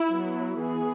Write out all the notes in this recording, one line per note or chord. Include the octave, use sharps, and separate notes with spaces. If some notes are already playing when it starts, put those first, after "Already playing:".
Already playing: E4
F#3 B3
E3 B3 G#4